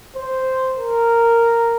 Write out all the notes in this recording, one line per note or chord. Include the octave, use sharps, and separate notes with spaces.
C5
A#4